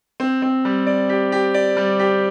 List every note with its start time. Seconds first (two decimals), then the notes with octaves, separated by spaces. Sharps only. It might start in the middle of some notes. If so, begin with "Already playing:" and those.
0.20 C4
0.42 C4
0.65 G3
0.87 D5
1.09 G4
1.32 G4
1.54 D5
1.77 G3
1.99 G4